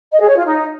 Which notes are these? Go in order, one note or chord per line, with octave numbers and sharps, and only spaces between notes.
D#5
G#4
C#5
F4
D#4